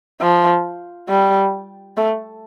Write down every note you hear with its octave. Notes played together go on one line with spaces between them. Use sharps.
F3
G3
A3